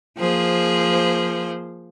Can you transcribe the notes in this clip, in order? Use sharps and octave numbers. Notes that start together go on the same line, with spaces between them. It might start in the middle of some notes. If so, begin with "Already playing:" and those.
F3 A#3 G#4 C5